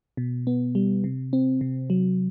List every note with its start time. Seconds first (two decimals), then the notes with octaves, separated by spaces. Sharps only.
0.17 B2
0.47 B3
0.75 G3
1.04 C3
1.33 C4
1.61 C3
1.90 F#3